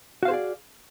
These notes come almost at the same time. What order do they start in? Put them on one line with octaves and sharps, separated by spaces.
F#4 F5 C5 G#4 D5